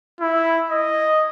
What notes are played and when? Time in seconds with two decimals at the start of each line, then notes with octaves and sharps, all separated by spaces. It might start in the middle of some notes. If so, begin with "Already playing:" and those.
0.20 E4
0.71 D#5